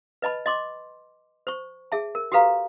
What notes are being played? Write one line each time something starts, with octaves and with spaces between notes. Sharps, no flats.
B4 D#5 A5 B5
D#5 C6 D6
C5 C#6
G#4 E5 A5
A#4
F#4 G4 A4 B4 F5 A#5